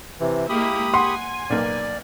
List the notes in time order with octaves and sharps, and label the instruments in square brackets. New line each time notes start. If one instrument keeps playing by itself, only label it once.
[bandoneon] C3 E3
[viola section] G#3 A#3 E4 [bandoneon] G4 B5 D#6
[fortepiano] F#5 [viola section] G#5 [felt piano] C6
[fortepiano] B1 A#3 [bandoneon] D5